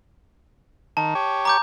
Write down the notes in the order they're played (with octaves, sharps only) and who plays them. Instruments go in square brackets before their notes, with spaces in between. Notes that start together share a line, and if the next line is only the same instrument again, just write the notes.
[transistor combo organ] D#3 [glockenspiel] A5
[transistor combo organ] G4 C#5
[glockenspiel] A#5 D6 G6